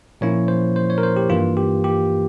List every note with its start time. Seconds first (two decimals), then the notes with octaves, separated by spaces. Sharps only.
0.21 A#2 F3 A#3 C#4 E4 C#5
0.48 C5
0.76 C5
0.90 C#5
0.98 A#4
1.03 C5
1.17 G4
1.30 G2 E3 A#3 F4
1.57 G4
1.84 G4